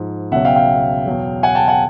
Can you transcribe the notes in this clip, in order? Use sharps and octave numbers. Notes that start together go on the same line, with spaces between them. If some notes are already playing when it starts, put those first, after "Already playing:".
Already playing: G#2 F3
C#2 B2 F#3 E5 F#5
F5 G5
F5 G5
E2 B2 F#3
F#5 G#5
G5 A5
F#5 G#5